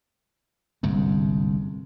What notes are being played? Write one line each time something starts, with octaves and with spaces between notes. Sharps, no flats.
G1 C2 G#2